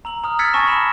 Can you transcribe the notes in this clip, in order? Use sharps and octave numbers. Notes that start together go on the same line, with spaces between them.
A#5 E6 F#7
A#5 D#6 F6
E6 F6 G#6 A6 B6 C#7
G#5 A5 C#6 A#6 E7
A5 B5 E7